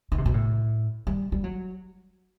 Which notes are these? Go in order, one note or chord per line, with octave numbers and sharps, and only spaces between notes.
D#3
C3
B2
A2
G3
G3
F#3